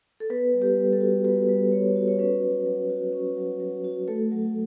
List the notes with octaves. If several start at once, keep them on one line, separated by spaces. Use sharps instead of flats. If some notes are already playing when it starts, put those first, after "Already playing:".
A4
B3 B4
G3
G4
G3
A4
F#4
B3 B4
G3
G3 C#5
F#4
C#5
C#4 B4
F#3
F#3
F#4
C#4
F#3
F#3
F#4
A3 A4
F#3